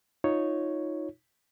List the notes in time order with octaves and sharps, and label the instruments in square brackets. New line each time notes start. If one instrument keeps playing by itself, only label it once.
[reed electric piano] D#4 F4 C#5